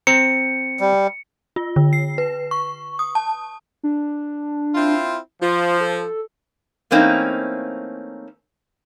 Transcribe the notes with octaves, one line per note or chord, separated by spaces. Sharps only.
C4 C5 A#5 C#7
G3
F4
D3
C7
B4
C#6
D#6
A5
D4
C4 E4 F4
F3 F4
A4
E3 A3 A#3 C4 C#4 D#4